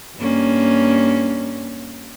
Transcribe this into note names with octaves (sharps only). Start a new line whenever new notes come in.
G2 A#3 C#4